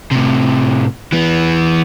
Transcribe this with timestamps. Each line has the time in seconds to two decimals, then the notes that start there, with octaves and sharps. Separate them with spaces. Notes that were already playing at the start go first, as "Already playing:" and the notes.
0.12 A2 C3
1.12 E3 B3